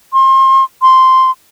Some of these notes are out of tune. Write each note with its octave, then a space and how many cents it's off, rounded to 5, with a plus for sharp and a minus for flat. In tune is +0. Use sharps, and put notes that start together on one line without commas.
C6 +35
C6 -5